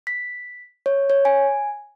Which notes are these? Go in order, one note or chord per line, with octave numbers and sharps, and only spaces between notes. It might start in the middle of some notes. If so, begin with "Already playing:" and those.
B6
C#5
C#5
G#5